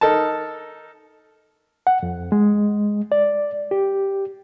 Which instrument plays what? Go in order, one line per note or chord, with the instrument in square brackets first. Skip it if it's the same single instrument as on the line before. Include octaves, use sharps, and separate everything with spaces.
[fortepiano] D#4 A4 A#4 A5
[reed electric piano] F#5
F2
G#3
D5
G4